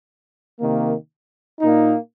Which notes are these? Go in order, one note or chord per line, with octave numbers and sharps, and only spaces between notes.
C3 D#3 A#3
A#2 A#3 D#4